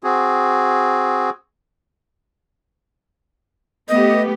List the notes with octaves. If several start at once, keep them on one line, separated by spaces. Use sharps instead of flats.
C4 F#4 G#4
A3 B3 G4 D#5